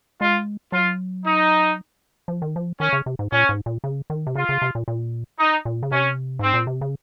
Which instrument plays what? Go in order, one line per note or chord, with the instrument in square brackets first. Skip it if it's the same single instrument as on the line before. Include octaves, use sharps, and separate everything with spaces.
[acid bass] G#3 [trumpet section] F4
[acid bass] F#3 [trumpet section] F4
[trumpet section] D#4
[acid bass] F3
D#3
F3
[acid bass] D#3 [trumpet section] C#4
[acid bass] C#3
C3
G#2
[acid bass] A#2 [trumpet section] C#4
[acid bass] G#2
A#2
C#3
D#3
C3
[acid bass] C#3 [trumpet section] F4
[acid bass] C#3
C3
A#2
A#2
[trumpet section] D#4
[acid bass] A#2
C#3
[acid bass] C3 [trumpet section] C#4
[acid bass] G#2 [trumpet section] C4
[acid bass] A#2
C3
C#3